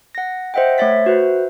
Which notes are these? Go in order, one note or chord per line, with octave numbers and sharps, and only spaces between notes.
F#5 A#6
C5 D#5 E5 F#5 G5
A3 C5 C#5 E5 A6 B6
F#4 B4 C5 E5